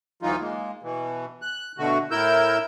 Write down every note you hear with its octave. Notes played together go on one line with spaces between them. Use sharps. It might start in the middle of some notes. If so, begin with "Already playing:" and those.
D2 E3 F#3 D#4 F4
G#3 A#3
B2 E3
F#6
B2 D3 A3 F#4
A2 E4 A#4 E6 G6